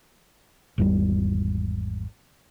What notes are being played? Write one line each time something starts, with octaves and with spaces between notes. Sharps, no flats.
G#1 E2 G3